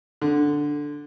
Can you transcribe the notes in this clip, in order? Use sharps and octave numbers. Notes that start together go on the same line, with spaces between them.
D3